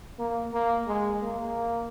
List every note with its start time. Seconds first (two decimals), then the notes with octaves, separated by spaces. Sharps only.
0.19 A#3
0.53 A#3
0.87 G#3
1.22 A#3